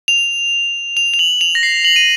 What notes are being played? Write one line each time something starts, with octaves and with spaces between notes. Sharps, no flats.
F7
F7
F7
F#7
F7
A#6
C7
F#7
D#7